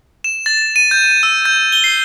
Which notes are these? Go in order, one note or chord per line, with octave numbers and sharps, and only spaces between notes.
E7
A6
D#7
G6
E6
G6
G7
C7